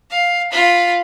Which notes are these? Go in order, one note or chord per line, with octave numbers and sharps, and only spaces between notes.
F5
F4 B5